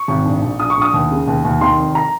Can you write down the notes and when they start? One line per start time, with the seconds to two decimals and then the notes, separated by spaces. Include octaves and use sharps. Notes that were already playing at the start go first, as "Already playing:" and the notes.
Already playing: C#6
0.08 G#1
0.25 A#1
0.42 A#1
0.59 A#1 D#6
0.70 C#6
0.77 A#1 D#6
0.94 D#2
1.11 C#3
1.28 D#2
1.45 D#2
1.61 D#3 C6
1.78 F1
1.95 A#5